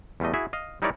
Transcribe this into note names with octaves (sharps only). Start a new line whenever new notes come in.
E2 G3 A3 D#5
E4 F#4 G#4 E5
D#5 F5
G3 D#4 E4 A#4 C#5 D5